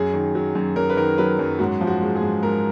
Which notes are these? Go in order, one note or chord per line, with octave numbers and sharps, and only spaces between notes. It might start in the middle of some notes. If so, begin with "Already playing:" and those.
Already playing: F#2 G#4
D#3
F#3
F#2
F#2 A#4
B4
D#3 A#4
F#3 B4
F#2
G#2 F#4
F3
F#4
G#3
G#4
G#2
G#2 A#4